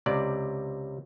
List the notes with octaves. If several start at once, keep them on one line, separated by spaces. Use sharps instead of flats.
C#2 C3 D5